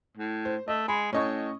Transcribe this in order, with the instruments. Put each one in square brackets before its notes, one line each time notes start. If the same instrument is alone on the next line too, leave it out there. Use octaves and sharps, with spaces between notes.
[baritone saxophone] A2
[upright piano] C5
[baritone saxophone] A3 [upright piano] D#5
[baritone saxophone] G#3 [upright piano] B5
[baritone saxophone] A2 [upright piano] C#4 D#5 C#6